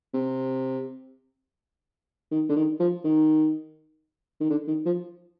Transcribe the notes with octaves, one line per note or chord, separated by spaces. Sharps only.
C3
D#3
D3
D#3
F3
D#3
D#3
D3
D#3
F3